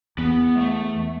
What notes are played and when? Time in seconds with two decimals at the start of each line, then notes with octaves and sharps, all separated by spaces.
0.18 E2 B3
0.55 G#3
0.59 A3